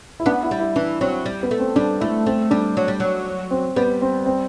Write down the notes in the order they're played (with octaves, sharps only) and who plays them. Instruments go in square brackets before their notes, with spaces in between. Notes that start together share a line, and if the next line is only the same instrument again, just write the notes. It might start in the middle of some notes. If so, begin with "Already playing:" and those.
[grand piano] E4
[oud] B3 [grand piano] D4
[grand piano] E4
[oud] G3
[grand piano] E4
[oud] E3 [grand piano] D4
[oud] F#3 [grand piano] C4
[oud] G3
[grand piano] B3
[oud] A3
[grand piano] C4
[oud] G3 [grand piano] D4
[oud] A3 [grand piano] E4
[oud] A3 [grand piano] C4
[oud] G3 [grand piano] D4
[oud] F#3
G3
F#3
[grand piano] C4
[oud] G3 [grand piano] B3
[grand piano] C4
C4